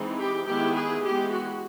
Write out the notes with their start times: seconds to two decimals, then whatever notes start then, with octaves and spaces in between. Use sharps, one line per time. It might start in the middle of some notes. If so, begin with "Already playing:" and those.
Already playing: E3 G#3 C4 D#4
0.18 G4
0.45 D#3 G#3 B3 E4 G4
0.74 G#4
1.01 E3 G#3 B3 G4
1.31 F#4